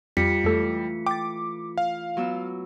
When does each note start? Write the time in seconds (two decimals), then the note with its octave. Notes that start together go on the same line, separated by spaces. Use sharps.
0.17 F2 G3 F4 B6 C#7
0.44 F2 E3 A3 E4 A4
1.06 G5 D6 A6
1.78 F5
2.17 F#3 B3 E6